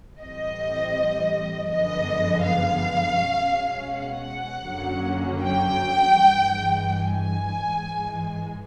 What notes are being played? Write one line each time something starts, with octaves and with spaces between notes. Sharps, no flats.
A2 E3 G3 C4 D#5
F#2 D3 F3 G#3 B3 D#5
F5
B2 G#3 C#4
F#5
F#2 D3 F#3 A#3 C#4
G5
G2 E3 G#3
G#5
G#2 E3 G#3